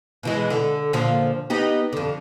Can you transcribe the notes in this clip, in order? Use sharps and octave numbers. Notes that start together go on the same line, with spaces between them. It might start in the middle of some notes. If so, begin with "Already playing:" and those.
B2 E3 G#3
D3
A#2 D3 F3
B3 D#4 G4
F2 D3